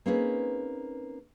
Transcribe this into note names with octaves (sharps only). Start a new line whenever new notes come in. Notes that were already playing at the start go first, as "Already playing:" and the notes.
A#3 C4 C#4 D#4 G#4 B4